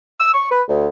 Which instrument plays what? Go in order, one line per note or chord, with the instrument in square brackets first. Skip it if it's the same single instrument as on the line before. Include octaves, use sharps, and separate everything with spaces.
[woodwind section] E6
C#6
B4
D2